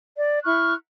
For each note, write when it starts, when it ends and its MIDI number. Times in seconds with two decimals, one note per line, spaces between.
0.15 0.38 74
0.44 0.73 64
0.44 0.73 85
0.44 0.73 89
0.44 0.73 90